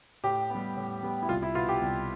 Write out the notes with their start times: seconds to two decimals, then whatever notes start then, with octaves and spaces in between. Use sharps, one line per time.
0.24 A2 G4
0.50 G3 B3
0.77 A2
1.03 G3 B3
1.23 E4
1.29 C2 F4
1.43 E4
1.55 B2 B3 F4
1.69 G4
1.82 C2